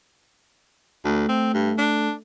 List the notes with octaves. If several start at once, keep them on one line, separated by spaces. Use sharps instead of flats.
D2 A3
C4
G2
D4